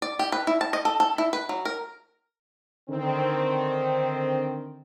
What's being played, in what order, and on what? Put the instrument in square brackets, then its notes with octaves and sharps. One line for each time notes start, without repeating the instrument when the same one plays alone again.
[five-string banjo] D5
G4
B4
E4
A5
D#5
A4
A4
E4
B4
F#3
A#4
[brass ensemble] D3 D#3 C4